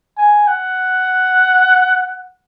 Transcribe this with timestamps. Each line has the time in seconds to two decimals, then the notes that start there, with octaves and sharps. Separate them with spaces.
0.17 G#5
0.47 F#5